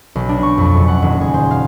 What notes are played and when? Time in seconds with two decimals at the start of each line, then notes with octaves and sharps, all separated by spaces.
0.15 B1
0.29 D4
0.43 C#6
0.58 F2
0.75 F#1
0.88 F#5
1.02 D#1
1.21 G#4
1.34 C5
1.51 F5